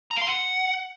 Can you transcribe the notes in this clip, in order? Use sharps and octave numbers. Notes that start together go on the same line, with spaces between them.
A#5
F5
C6
F#5